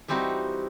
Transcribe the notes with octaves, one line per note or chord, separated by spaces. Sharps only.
E3 G3 C4 D#4 F#4